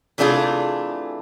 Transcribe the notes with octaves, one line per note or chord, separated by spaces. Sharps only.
C3 E3 A3 D4 F4 G#4